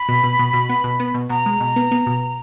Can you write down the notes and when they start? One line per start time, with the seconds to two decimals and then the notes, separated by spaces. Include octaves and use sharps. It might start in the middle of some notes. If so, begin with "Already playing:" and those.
Already playing: B5
0.09 B2
0.23 B2
0.39 B2
0.53 B2
0.69 B3
0.84 B2
1.00 B3
1.14 B2
1.29 B2 A#5
1.46 G#3
1.60 B2
1.76 B3
1.91 B3
2.06 B2